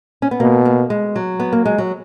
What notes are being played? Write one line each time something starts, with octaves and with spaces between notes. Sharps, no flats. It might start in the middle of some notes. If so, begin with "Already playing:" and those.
C#4
B3
B2 A#3
A#3
G#3
F#3
B3
A#3
G#3
F#3